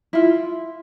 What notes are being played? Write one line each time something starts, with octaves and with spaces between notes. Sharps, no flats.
E4 F4